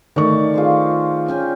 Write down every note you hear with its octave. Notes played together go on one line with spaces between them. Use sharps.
D#3 A3 D5 C#6
F4 G#4 C5
C#4 G5 G#5